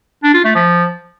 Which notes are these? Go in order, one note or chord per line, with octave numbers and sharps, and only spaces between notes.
D4
F4
A3
F3